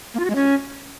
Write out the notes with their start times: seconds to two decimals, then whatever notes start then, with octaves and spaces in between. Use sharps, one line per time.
0.14 A#3
0.20 F4
0.25 F#4
0.30 G#3
0.35 C#4